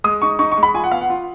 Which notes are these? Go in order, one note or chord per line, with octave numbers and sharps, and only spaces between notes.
G#3 D#6
D#4 C#6
D#4 C#6
C#6
G#3
B5
F4 G#5
F#5
B3 F5
F#5
F4